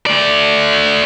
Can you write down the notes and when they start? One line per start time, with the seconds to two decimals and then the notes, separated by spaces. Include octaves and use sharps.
0.06 A3 D5